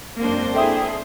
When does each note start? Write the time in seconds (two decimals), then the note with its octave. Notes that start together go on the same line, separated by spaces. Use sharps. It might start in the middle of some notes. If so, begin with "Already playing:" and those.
0.20 F#2 G#3 A#3 C4 D4 C5
0.54 A#3 E4 G#4 A4 E5 G5 D#6